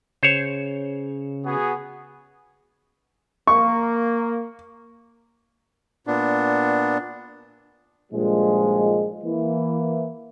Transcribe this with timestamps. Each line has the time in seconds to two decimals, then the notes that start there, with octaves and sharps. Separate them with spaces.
0.23 C#3 C5 C#5
1.45 B3 F#4 G#4
3.47 A#3 C#6
6.07 A#2 B3 D4
8.12 G2 A#2 D#3 F3 G#3
9.23 E3 A#3